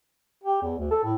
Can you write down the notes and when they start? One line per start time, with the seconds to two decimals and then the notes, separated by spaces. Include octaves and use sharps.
0.44 G4
0.62 E2
0.78 D2
0.91 A4
1.04 A2